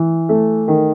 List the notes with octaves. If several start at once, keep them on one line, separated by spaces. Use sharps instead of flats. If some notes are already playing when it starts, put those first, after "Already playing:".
Already playing: E3
A3
D#3